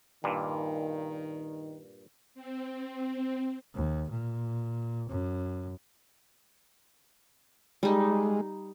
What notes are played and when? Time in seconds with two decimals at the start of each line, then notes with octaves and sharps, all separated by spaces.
0.24 G2 A#2 D#3
2.35 C4
3.74 D#2
4.10 A#2
5.09 F#2
7.83 G3 G#3 D#4